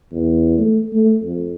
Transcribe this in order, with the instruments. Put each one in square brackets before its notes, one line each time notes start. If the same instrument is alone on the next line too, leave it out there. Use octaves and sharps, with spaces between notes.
[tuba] E2
A3
A3
F2